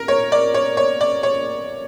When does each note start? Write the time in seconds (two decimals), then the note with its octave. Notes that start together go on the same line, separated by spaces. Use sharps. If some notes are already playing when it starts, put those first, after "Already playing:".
Already playing: A#4
0.08 C#5
0.32 D5
0.54 C#5
0.77 C#5
1.01 D5
1.23 C#5